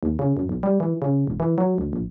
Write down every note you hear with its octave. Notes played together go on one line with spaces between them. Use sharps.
D#2
C#3
F#2
B1
G3
E3
C#3
E1
E3
F#3
D2
A#1